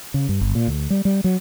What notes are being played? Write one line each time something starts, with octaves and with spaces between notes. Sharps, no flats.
C#3
G2
G1
A#2
D2
G3
G3
F#3